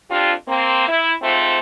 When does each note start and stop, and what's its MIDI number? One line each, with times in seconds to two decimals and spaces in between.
0.10 0.32 41
0.10 0.32 62
0.10 0.32 65
0.10 0.32 67
0.47 0.85 58
0.47 0.85 60
0.88 1.14 64
1.22 1.59 44
1.22 1.59 57
1.22 1.59 60
1.22 1.59 65